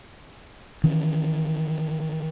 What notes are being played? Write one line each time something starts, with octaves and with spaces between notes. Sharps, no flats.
D#3 E3 C#4